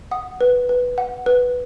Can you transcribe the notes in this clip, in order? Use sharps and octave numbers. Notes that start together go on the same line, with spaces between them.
F#5 D#6
B4
B4
F#5
B4